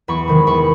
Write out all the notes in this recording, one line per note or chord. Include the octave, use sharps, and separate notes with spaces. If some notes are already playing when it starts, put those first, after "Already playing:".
E2 B5 C#6
C3 D#3 G#3
E2 B5 C#6